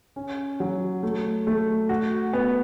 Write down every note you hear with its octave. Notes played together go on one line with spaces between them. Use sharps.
C#4
F#3
A3
A3
F#4
B3